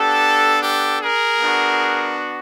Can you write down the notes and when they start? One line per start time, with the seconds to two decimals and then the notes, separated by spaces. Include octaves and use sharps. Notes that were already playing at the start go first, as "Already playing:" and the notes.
Already playing: B3 D4 G4 A4
0.63 G4 A4
1.01 G#4 A#4
1.39 B3 D4 F#4